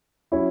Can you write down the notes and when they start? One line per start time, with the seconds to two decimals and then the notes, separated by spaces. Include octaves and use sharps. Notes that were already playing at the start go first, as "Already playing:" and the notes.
0.32 F#3 C#4 E4 C#5